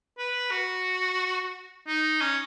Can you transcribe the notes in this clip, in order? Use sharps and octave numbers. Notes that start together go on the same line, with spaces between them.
B4
F#4
D#4
C#4